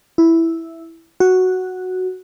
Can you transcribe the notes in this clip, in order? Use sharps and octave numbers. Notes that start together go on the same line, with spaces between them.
E4
F#4